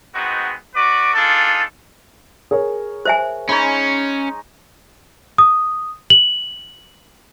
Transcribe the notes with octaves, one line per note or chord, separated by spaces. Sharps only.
G#3 B3 C4 D#4 F#4
F#4 B4 D5 D6
D4 D#4 F4 G#4 A4
G#4 A#4 C#5
C5 E5 G#5
G#3 C#4 D#4 C#5 B5
D#6
F#7